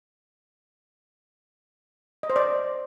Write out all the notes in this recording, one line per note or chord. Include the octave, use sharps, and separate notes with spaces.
D#5
C5
D5